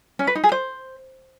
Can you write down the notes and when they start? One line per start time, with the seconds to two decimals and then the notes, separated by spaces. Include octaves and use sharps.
0.19 C#4
0.27 B4
0.35 D#4
0.44 G#4
0.52 C5